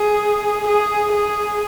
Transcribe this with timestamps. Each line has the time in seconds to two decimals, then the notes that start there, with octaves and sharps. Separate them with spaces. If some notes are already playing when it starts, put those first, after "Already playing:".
Already playing: G#4
0.68 G#4
1.13 G#4